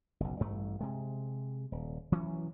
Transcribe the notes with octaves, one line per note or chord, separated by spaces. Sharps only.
F#1 B1
A1 G2 A3
C3 G#3
D#1
E3 F#3 C#4